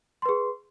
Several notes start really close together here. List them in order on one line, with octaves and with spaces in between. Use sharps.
C6 B4 G#4